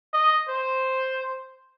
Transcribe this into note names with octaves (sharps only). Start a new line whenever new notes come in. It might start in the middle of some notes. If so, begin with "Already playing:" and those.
D#5
C5